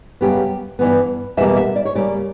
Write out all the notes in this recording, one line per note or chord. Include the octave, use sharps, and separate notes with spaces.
F#2 C#3 G3 B3 G4
G2 E3 B3
E2 B2 G3 A#3 E5
E5
D5
C#5
C#3 G3 A#3 D5